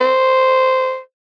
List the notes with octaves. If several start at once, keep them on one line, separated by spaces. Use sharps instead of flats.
C5